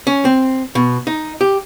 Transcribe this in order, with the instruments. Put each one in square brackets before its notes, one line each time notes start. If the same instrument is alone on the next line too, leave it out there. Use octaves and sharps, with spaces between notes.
[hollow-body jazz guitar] C#4
C4
B2
D#4
G4